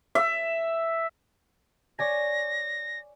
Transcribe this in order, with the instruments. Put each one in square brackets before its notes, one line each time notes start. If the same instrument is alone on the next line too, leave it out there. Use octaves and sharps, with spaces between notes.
[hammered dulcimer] E5
[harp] C#5 D5 G#5 [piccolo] A#6